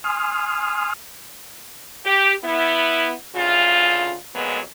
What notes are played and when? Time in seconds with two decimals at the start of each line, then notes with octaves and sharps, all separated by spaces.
0.04 G#5 C6 D#6 F6
2.06 G4
2.44 B3 E4
3.35 D2 C#3 E3 F4
4.35 F2 A#2 F3 F#3 G#3 B3